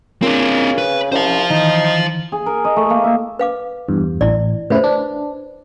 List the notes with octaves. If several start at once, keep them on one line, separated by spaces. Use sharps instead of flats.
C#3 C4 D4 F4 A#4
B4
C2 C#4 C5 F5
D#3 E3 D#4
G#4
A#4
D#5
A3
A#3
E5
B4 F5 D6
E2 G2
A1 E4 D5
A2 C#3 E4 B4 C5
D4